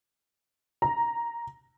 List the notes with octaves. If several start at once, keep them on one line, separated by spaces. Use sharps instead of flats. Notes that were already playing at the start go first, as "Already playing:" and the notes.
A#5